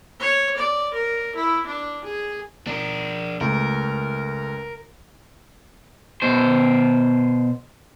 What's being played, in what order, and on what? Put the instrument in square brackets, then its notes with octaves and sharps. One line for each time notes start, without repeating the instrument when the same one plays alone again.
[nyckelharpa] C#5
D5
A#4
E4
D4
G#4
[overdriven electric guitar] D4 A#4
[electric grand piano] C#2 A3 [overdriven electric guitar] A#4
[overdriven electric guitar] B2 C5